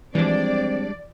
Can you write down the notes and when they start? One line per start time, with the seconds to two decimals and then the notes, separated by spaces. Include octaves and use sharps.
0.15 E3 F3 G3 G#3 C4 D4 D5